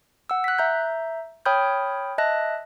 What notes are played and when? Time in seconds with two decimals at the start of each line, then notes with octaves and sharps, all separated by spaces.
0.30 F#5 E6
0.44 F#6 B6
0.58 E5 A#5 G6
1.46 C#5 G5 B5 D#6 F6 G6
2.18 D#5 E5 A5 F#6 A#6